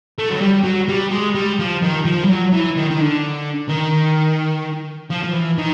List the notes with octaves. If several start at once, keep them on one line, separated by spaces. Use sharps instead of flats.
A3
F#3
G3
F#3
G3
G#3
G3
F3
D#3
F3
G3
F#3
E3
D#3
D#3
D3
D#3
F3
F3
E3
D#3